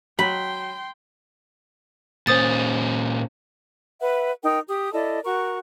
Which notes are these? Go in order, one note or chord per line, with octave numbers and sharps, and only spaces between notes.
F#3 G5 B5 C6
A#2 C#4 C5 D#6 A6
B4 E5 F#5
D#4 A#4 G5
G4 D#6
E4 A4 D5 D#5
F#4 A#4 C#6